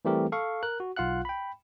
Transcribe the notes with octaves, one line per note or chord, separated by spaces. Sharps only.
E3 G3 A3 C4 G4 A#4
A4 F5 C#6
A#4 F#6
F#4
B1 F4 F5 F#5 F#6
G5 B5